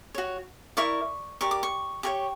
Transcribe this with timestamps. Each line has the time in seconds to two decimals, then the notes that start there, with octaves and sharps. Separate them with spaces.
0.15 F#4 C#5
0.77 E4 A#4 D5 C#6
1.41 G4 A#4 D5 C#6
1.51 D6
1.63 C#6
2.03 G4 A#4 C#5 C#6